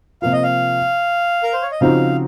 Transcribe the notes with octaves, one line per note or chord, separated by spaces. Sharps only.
C3 F3 A#3 F4 F5
D#5
F5
A#4
C5
C#5
D#5
C#3 F3 C4 D#4 F#4 F5